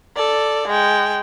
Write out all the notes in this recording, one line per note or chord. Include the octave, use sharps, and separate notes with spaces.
A4 D5
G#3 G5